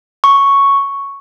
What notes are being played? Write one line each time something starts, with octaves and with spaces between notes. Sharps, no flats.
C#6